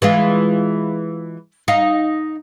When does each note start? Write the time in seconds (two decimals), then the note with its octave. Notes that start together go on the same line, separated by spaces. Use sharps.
0.02 E3 G#3 F4
1.68 D#4 F5